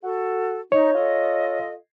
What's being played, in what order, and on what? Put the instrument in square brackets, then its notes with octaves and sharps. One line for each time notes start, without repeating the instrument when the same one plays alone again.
[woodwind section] F#4 A4
[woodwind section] D#4 [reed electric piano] C#5
[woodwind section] F4 A4 D#5